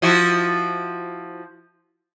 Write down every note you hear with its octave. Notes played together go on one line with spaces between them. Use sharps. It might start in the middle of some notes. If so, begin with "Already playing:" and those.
F3 E4 F#4